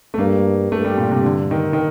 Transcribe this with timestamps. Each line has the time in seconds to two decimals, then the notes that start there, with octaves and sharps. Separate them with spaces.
0.14 A3
0.18 G2 A#3
0.72 G2 A3
0.85 G3
0.97 A#2
1.11 C3
1.24 D3
1.51 D#3
1.73 D#3